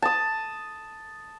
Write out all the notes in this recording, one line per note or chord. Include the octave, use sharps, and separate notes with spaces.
A5 D#6